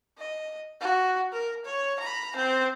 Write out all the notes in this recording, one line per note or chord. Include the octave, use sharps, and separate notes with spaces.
D#5
F#4
A#4
C#5
A#5 B5
C4 C5